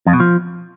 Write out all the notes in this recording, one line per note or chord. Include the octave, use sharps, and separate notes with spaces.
F2
B2
F3